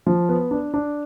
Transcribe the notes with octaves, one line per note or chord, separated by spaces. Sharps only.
F3
B3
D4
D4